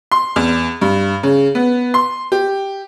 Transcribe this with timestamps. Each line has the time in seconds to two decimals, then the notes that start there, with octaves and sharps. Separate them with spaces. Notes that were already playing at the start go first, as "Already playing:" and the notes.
0.12 C6
0.36 E2
0.81 G2
1.23 C#3
1.55 B3
1.94 C6
2.32 G4